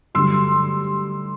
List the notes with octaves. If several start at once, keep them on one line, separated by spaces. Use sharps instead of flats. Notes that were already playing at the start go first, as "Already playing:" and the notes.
G2 D3 F#3 A3 C6 E6